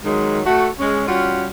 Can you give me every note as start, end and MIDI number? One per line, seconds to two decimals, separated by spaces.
0.04 0.42 51
0.04 0.42 54
0.04 0.42 56
0.46 0.68 57
0.46 0.68 66
0.79 1.04 56
0.79 1.04 61
1.08 1.47 55
1.08 1.47 61
1.08 1.47 65
1.08 1.47 66